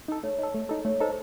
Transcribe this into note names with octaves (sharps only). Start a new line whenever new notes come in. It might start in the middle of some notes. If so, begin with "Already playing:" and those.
D#4 A4
A3 C#5
D#4 A4
A3
D#4 A4
A3 C#5
D#4 A4 C5